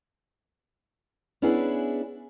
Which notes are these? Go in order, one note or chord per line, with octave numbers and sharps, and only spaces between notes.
B3 C#4 D4 E4 G#4 B4